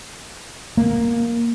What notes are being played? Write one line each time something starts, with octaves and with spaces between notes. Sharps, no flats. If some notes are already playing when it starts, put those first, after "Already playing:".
A#3